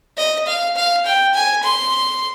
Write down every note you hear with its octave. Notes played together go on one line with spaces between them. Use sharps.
D#5
F5
F5
G5
G#5
C6